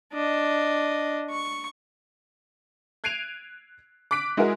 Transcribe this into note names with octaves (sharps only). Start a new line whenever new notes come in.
D4 D#5
C#6
F#6 G#6 C7 D7 D#7 F7
D6 F#6 B6 D7
G#3 E4 F#4 G#4 A#4